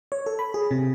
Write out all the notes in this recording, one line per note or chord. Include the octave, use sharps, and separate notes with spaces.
C#5
A4
B5
G#4
C3